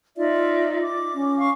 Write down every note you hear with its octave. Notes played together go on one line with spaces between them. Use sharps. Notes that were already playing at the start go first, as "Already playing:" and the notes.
D#4 F4 D5 E5
D6
C#4
F5 C#6